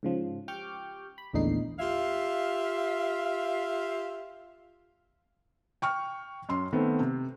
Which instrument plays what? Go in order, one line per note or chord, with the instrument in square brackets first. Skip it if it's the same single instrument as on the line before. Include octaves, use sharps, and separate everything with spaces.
[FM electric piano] G#2 C#3 F3
G4 G5 C#6 D6 F6 G6
B5
A#1 E2 A2 D3 D#4 C7
[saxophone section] F4 G4 E5 F5
[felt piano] G5 C#6 F6
F#2 C6
D#3 A3 B3 C4
C3